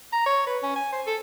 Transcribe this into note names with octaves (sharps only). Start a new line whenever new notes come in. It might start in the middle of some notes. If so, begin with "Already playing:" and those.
A#5
C#5
B4
C#4
G#5
C5
A4